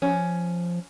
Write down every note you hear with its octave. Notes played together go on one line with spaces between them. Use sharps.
F3 C#4